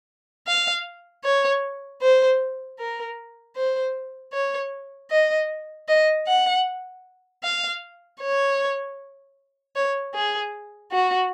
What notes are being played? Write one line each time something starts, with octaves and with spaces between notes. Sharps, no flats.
F5
C#5
C5
A#4
C5
C#5
D#5
D#5
F#5
F5
C#5
C#5
G#4
F#4